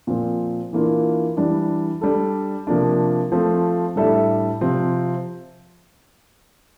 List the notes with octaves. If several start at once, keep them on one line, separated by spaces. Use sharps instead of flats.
A#2 F3 C4
E3 A#3 D4 F4
E3 G3 D4
G3 D4 A4
C3 F3 A#3 D4
F3 A3 C4
A2 G3 D4 A4 E5
C3 F3 C4